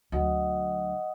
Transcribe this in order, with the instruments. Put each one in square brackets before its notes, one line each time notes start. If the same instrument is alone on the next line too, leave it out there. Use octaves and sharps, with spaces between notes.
[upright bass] D2 F#3 [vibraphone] D#5 F#5 D#6